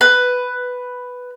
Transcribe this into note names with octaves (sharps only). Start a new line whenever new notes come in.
B4